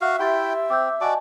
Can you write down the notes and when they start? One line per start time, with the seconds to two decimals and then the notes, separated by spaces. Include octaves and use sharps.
0.01 F#4 E5 F5
0.19 E4 G4 G5 C6 A6
0.70 C4 D6 E6 G6
1.01 F#4 D5 D#5 G#5 A5 D6